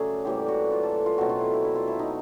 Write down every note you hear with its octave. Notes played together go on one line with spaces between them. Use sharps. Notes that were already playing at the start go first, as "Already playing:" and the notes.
Already playing: C#3 F#3 A3 G#4 D5 E5
A2 E3 G3 A#3 G4
F#4
F4
A4
F4
B2 F#3 A3 C4 F#4
F4
E4
E4
E4
F4
E4
D#4